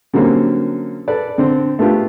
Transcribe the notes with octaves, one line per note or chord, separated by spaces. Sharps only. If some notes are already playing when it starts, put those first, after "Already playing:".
D3 F#3 G3 A#3 C4 C#4
A4 B4 D5
D3 C4
A3 B3 D4 F4 G4